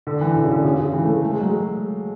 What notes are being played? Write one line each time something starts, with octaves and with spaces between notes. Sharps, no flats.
D3
E3
D3
C#3
D3
C#3
C#3
E3
A3
G#3
A3
G#3
F#3
G#3